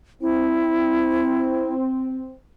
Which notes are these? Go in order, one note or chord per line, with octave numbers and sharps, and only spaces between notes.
C4 E4